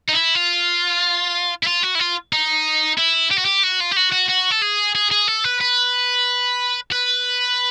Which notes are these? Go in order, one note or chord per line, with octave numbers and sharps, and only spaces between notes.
D#4
E4
F4
E4
F4
F#4
E4
F4
D#4
E4
G4
F#4
G4
F#4
F4
G4
F#4
F#4
F#4
A4
G#4
G#4
G#4
A4
B4
B4
B4